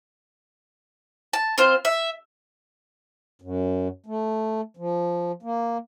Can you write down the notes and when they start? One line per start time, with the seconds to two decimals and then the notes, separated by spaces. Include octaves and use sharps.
1.33 A5
1.58 C4 F4 C5
1.85 E5
3.42 F#2
4.06 A3
4.77 F3
5.43 A#3